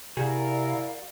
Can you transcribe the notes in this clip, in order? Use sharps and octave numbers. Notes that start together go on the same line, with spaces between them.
C3 E4 F#4 G#4 A#4 D5 F5